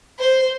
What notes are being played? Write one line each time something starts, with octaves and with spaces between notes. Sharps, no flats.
C5